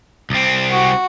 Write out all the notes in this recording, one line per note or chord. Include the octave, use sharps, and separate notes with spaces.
C2 C4
F#4